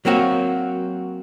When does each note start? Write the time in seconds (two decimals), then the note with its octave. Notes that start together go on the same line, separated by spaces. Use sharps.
0.05 F#3 A#3 C4 F#4